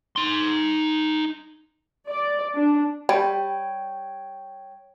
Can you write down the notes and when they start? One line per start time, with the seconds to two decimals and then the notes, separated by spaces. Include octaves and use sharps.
0.16 D#4 C6
2.08 D5
2.55 D4
3.09 G3 C#5 G5